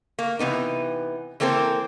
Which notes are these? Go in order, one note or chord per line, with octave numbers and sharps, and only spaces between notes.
A#3
C3 E3 B3 D#4
E3 A#3 C4 A4 A#4 C5